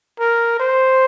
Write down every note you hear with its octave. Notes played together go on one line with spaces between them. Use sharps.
A#4
C5